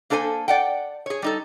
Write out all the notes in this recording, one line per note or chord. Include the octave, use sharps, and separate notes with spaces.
A#3 D4 A4 C5 G#5
D5 F#5 G5
G#4 C#5
G3 D#4 A4